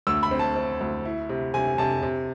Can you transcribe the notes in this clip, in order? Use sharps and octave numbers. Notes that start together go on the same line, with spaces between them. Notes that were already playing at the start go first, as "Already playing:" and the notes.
D2 E6
B5
C4
A5
C4
D2
E4
C3
C3 G#5
C3 A5
C3